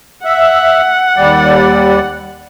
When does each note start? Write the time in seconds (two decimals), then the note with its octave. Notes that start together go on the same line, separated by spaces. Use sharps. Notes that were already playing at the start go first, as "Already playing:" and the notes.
0.25 E5 F#5
1.17 D#2 G3 D5